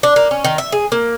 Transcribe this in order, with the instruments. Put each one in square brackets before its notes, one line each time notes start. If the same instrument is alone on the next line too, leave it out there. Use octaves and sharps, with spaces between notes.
[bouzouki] D4
A#3
C#4
D#3
E5
G#4
A#3